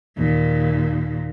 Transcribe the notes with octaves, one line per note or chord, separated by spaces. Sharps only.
D#2 A#2